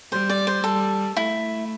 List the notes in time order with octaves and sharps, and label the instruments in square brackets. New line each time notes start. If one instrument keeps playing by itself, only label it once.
[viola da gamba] G3 [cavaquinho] C5
[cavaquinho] D5
C5
[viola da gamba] G3 [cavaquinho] A4
[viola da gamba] A3 [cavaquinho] E4